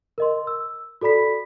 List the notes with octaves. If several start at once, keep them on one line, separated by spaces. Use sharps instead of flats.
A#4 D#5 C6
E6
F#4 A4 D5 B5 B6